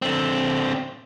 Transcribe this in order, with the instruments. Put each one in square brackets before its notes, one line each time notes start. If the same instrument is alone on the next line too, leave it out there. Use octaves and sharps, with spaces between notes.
[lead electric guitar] D3 C4